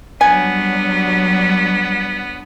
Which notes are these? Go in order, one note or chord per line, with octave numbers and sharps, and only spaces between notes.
F#3 G3 B3 D4 G#5